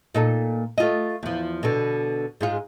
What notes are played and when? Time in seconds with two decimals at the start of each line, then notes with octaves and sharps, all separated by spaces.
0.15 A#2 D#4 A4
0.78 A3 F4 D#5
1.23 E2 F3
1.63 B2 D3
2.41 G#2 G#3 F4